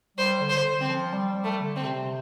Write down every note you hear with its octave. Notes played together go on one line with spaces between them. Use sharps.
G3 C5
D3
C5
D3
C4
F3
G3
G3
A3
D3
C4
C3